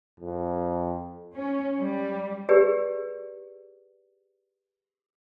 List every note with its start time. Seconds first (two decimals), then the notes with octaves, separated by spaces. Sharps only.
0.20 F2
1.35 C#4
1.79 G3
2.49 G4 G#4 B4 D5